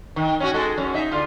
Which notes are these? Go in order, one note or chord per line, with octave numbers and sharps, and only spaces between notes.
D#3
C#4 D#4 F#4
G#3 F#4 A4
F#2 C#4
D#4 E5
D3 F4